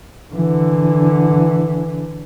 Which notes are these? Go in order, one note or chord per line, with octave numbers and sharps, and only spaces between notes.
D3 E3